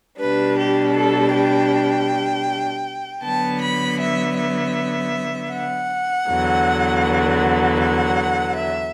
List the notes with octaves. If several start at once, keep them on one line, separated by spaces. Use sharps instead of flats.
B2 G3 D4 B4
G4
A4
G5
D3 F#3 B3 A5
B5
E5
E5
F#5
E2 D3 F#3
F#5
E5